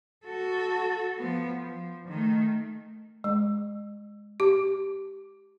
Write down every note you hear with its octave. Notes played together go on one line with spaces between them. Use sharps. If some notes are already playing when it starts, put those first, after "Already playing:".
F#4 A4
F3 B3
F3
D#3 A3
G#3
G4